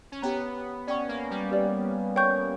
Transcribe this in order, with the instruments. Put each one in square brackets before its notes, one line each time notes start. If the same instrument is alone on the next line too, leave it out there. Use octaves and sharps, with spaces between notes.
[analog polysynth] C#4
[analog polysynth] B3 [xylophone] G4 C#5 G5 A#5
[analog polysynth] C#4 [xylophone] D5 G5 C#6
[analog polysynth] A#3
G3
[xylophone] G4 B4 D5
C#5 G5 C#6 G6